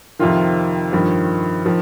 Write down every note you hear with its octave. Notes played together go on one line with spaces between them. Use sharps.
F2 C3 D#3 F4
G2 D#3 F3
D#3 F3